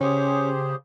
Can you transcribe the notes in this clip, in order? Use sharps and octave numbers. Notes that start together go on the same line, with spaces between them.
C#3 C#4 G4 G#4 C5